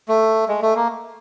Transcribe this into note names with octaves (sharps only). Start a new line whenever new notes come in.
A3
G#3
A3
A#3